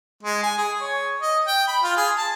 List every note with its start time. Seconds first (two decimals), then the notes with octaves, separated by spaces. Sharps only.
0.23 G#3
0.43 G#5
0.58 G#4
0.81 C#5
1.21 D#5
1.47 G5
1.67 B5
1.83 F4
1.97 G#4
2.17 A5